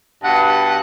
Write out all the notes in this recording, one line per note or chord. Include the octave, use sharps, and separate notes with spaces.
G2 B2 F#5